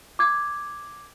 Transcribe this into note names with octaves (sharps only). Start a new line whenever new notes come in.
D6 G#6